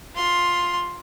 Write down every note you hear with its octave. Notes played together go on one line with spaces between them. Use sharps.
F4 C6